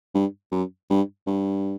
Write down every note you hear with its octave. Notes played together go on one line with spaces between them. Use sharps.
G2
F#2
G2
G2